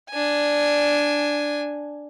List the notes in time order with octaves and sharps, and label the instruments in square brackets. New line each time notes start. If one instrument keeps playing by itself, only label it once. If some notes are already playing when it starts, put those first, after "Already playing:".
[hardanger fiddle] D4 G#5